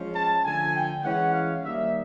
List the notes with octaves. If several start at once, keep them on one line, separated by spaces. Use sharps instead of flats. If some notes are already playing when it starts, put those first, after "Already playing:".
Already playing: F3 G#3 C#4
A5
D3 F3 A3 G#5
G5
E3 G#3 C#4 E4 F#5
F5
D#3 G3 A#3 D#4 E5